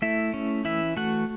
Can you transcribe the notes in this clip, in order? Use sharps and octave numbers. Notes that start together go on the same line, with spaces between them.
A3 E4 E5
C#4
E3 E4 E5
A3 F#4 F#5